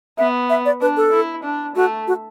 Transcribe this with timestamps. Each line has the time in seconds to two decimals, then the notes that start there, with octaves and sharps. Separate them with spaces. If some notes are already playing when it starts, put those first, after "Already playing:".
0.18 B3 E5
0.50 E5
0.65 D5
0.81 D4 B4
0.97 A4
1.13 E4
1.44 D4
1.76 A3 F#4
2.08 F#4